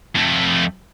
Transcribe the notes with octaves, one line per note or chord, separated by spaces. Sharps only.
F2 A3